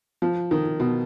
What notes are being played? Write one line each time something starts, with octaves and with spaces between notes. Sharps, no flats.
F3
D#3
B2